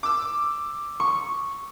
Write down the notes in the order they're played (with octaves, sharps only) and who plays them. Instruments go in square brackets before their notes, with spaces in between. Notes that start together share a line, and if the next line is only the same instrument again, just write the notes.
[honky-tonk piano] D6 E6
[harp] C#6